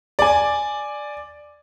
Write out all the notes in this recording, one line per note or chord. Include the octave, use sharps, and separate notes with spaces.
D5 G#5